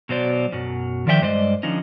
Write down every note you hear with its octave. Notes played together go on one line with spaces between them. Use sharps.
B2 F#3 C5 D5
F#2 B2 F#3
D#3 F3 D5 E5 F#5 G5
G2 G#3 C5 D5 D#5
D3 F3 C#4 D#4